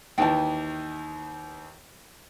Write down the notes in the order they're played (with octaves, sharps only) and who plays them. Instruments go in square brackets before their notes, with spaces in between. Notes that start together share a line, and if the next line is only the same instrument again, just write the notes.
[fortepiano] D#2 D#3 E3 [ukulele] G5 A5